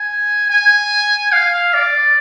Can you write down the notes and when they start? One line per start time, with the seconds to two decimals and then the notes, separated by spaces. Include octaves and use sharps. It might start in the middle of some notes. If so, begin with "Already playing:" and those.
Already playing: G#5
0.50 G#5
1.32 F5
1.74 D5